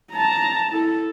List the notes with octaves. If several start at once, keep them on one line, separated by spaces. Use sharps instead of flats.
A5 A#5
E4 A4